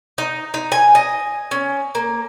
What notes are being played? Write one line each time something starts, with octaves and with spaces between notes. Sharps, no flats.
D#4
D#4
G#5
D#5
C#4
A#3